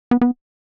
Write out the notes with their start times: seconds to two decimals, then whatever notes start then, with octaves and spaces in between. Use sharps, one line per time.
0.11 B3
0.21 B3